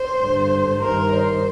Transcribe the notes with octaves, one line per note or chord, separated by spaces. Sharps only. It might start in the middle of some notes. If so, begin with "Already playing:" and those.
Already playing: C5
G2 D3
G2 D#3 A#4
C5